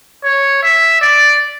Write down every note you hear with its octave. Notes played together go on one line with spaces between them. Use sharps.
C#5
E5
D5